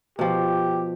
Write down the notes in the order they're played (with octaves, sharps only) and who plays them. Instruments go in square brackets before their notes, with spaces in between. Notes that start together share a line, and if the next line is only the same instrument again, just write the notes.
[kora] B2 F3 [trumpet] G4